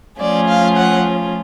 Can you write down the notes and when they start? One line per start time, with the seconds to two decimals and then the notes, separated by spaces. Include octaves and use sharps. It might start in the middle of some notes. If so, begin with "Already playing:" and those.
0.20 F3 A3 C#4 F4 G#4 D5
0.49 F5
0.77 F#5